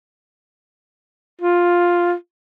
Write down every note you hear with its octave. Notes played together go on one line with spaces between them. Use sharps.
F4